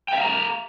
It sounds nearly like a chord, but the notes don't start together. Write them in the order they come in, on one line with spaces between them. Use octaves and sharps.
G5 E5 F5 A#5